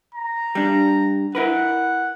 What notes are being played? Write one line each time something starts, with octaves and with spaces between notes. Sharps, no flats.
A#5
G3 D4
E4 A#4 B4 F#5